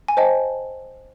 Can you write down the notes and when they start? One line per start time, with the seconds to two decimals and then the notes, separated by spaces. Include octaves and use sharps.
0.08 G#5
0.17 C5 D#5 G5 A5